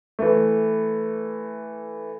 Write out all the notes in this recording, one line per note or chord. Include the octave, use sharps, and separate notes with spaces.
E3 A3